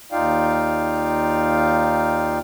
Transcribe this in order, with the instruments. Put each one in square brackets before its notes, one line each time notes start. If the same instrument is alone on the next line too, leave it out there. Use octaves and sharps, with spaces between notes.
[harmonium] D#2 D#4 F4 D5 F5 G5